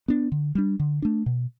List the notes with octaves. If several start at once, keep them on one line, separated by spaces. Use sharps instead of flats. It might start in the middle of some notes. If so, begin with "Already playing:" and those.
B3 D4
D3
G3 D4
D3
A3 D4
B2